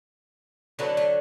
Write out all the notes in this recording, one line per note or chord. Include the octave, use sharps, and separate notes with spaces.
D3 F#3 A3 B3
A3